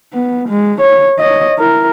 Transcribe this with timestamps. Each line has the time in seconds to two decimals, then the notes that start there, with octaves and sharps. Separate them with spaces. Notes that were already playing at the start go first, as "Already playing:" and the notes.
0.13 B3
0.49 G#3
0.81 C#5
1.19 C#5 D#5
1.59 E4 A#4